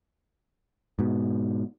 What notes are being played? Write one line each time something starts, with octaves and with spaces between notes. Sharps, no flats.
G#2 B2